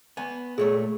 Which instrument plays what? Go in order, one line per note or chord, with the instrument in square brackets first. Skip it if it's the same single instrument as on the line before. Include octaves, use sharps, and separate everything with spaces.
[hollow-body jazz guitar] B3 G#5
[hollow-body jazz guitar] A#2 A3 C#5 [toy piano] G#4